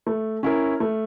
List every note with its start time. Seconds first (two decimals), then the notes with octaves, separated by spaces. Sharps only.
0.07 A3
0.43 C#4 E4 A#4
0.80 A3